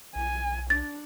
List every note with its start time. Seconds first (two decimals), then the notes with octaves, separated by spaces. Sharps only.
0.16 B1 G#5
0.70 D4 A6